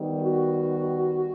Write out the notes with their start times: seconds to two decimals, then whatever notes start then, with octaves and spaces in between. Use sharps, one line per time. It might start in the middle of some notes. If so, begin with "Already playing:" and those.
Already playing: D#3 G3 B3
0.21 F#4